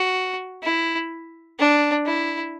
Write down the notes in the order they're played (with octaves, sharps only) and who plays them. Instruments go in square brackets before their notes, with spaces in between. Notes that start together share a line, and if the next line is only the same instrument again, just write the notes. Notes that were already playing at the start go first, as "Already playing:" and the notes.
Already playing: [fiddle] F#4
E4
D4
E4